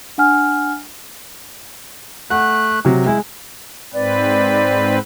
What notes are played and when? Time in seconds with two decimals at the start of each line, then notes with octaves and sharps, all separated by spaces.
0.18 D4 F#5 G#5 F6
2.30 A3 F#5 F#6
2.85 C3 F#3
3.06 G#3 E4
3.94 G#2 C4 B4 D5